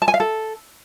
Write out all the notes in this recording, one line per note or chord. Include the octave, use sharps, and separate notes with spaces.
A5
G#5
F5
A4